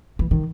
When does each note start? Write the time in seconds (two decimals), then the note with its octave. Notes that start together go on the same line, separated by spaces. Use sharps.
0.19 E3
0.31 D#3